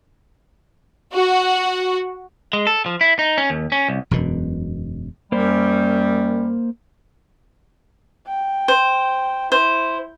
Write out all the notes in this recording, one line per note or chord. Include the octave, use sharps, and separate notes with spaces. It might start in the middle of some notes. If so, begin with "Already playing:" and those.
F#4
G#3
A4
F3
E4
D#4
C#4
D#2
C#4
C2
E1 F#2 B2
F#2 G3 A#3 C5
G5
C5
E4 C5